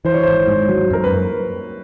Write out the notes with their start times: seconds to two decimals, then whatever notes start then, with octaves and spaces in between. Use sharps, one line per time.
0.05 E3 C5
0.14 C#5
0.23 G#1 C5
0.47 G#2
0.69 F#3
0.91 F#2 A#4
1.04 B4